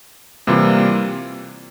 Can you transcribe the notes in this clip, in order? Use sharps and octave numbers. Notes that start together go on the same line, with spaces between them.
C3 E3 G3 A#3 F4